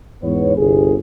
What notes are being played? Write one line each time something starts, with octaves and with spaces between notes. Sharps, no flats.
E2 G#2 B3 C#5
G1 C2 G#4